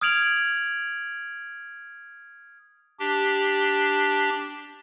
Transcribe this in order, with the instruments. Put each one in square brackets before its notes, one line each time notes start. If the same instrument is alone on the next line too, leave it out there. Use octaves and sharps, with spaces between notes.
[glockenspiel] D#6 F6 G#6 D7 F7 F#7
[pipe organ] D4 G4